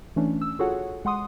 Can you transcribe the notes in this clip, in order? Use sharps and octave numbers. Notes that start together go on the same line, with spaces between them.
E3 A3 C#4 D4
E6
F4 F#4 G#4 A4 C#5 F#5
G#3 F#5 C6 D#6